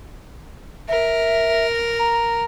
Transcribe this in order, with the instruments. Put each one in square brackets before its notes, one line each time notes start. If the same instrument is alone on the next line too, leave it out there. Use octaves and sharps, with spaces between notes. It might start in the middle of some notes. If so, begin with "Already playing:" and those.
[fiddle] A#4 [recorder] E5
[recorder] A#5